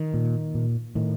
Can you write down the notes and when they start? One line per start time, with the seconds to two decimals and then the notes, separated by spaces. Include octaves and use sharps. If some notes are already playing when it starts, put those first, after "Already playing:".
Already playing: D#3
0.14 A#2
0.55 A#2
0.95 A2 D#3